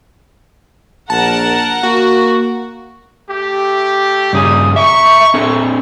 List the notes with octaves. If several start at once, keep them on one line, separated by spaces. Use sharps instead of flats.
A#1 A#4 F#5 A5
A#3 F#4
A3 G4
G2 C#3 G#4 A#5 D#6
E5 A#5 C#6
C4 D4 A4